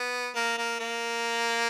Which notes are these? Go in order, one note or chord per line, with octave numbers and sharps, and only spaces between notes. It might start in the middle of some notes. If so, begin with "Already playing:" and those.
Already playing: B3
A#3
A#3
A#3